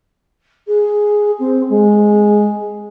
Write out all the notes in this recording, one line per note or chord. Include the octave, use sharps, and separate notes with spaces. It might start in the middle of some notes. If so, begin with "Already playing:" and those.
G#4
C4
G#3